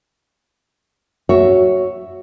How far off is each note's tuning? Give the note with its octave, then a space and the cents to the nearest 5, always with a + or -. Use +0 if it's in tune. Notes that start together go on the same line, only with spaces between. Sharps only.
F#4 +0 C#5 +5 E5 +0